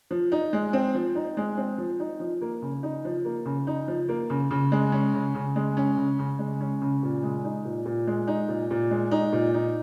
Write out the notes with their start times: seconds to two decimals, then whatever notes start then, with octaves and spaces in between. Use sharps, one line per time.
0.11 F3
0.32 D#4
0.53 G#3
0.73 C4
0.95 F3
1.15 D#4
1.37 G#3
1.57 C4
1.78 F3
2.00 D#4
2.20 F3
2.41 A#3
2.62 C#3
2.83 D#4
3.05 F3
3.25 A#3
3.45 C#3
3.67 D#4
3.88 F3
4.09 A#3
4.30 C#3
4.51 C#3
4.72 G#3
4.92 C#4
5.14 C#3
5.35 C#3
5.56 G#3
5.77 C#4
5.97 C#3
6.19 C#3
6.39 G#3
6.61 C#4
6.82 C#3
7.03 A#2
7.23 G#3
7.44 D#4
7.65 A#2
7.86 A#2
8.07 G#3
8.28 D#4
8.49 A#2
8.71 A#2
8.91 G#3
9.12 D#4
9.33 A#2
9.54 D#4